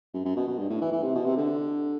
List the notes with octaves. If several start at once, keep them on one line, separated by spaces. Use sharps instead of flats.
F#2
F#2
B2
B2
G2
A2
E3
E3
C3
B2
C3
D3